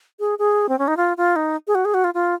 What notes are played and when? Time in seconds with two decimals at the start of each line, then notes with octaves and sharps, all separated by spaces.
0.20 G#4
0.39 G#4
0.69 C4
0.79 C#4
0.88 D#4
0.97 F4
1.17 F4
1.36 D#4
1.67 G#4
1.75 F#4
1.85 G#4
1.94 F#4
2.04 F4
2.14 F4